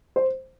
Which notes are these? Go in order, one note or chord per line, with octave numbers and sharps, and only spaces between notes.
C5